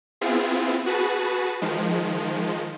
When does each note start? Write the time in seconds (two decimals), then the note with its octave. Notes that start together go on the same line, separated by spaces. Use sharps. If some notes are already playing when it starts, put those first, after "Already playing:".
0.21 B3 C4 E4 F4 G#4
0.86 F#4 G#4 B4 A5
1.62 D#3 F3 G#3